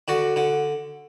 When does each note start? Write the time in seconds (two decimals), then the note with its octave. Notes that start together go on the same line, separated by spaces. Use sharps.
0.08 D3 F#4
0.36 D3